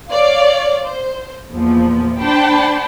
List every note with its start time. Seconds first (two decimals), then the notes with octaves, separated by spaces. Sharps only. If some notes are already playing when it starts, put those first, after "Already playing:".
0.10 C#5 D5 F5
0.85 C5
1.51 E2 A#2 F3
2.20 D4 C5 G5 A5 B5